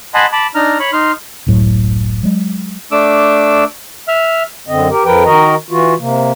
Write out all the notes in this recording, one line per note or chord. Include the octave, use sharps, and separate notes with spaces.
D#5 F#5 G#5 A5 B5 C6
A5 B5 D6
D4 D#4 A#5 F6
C#5 B5 C#6
D#4 C6 F6
F#1 C#2 A2 F#3
F#3 G#3
A3 D4 D6 E6
E5 F6
F#2 D3 C4 D#5
G4 A#4
F2 F3 A#4 B4 G5
D#3 F#4 A#4 D#5 A#5
E3 F4 F#4
C3 A#3